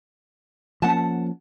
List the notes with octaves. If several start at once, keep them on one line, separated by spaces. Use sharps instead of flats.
F3 A#3 C#4 F#5 A5